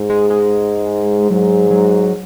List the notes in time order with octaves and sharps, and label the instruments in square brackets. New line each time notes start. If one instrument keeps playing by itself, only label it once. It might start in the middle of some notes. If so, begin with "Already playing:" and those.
Already playing: [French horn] G#2
[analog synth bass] G#3
G#3
[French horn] G#2 [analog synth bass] F#3
[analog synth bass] F#3